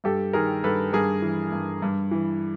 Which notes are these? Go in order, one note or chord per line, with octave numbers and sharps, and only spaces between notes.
G2 G4 A4
D#3 G#4 A#4
G2 A4 B4
G2 G#4 A#4
E3
G2
G2
E3